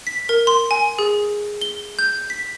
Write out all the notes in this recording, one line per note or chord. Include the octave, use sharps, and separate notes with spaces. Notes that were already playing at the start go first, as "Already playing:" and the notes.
B6
A#4
C6
G#5
G#4
G7
G6
B6